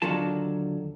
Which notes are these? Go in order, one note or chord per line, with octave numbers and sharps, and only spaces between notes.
D#2 D3 F#3 A#3 F4 A5